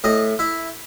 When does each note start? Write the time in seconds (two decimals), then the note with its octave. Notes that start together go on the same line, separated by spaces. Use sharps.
0.04 A2 D#5
0.39 E4